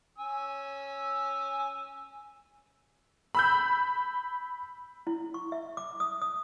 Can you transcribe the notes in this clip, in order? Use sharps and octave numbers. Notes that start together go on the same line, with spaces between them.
C#4 G#5 E6
B5 E6 G6
E4
C#6
E5
D6
D#6
D#6